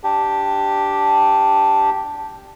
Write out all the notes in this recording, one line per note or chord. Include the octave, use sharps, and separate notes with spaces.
D4 G4